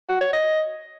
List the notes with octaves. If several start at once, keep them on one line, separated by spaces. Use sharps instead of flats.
F#4
C#5
D#5